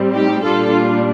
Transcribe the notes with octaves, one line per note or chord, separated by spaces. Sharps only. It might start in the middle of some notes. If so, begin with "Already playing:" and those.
Already playing: A2 G3 C4
D#4 G4
A#2 G3 D4 F4 A4
F4